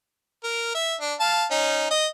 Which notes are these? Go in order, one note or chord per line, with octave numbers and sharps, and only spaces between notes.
A#4
E5
D4
F5 A5
C#4 D#4
D#5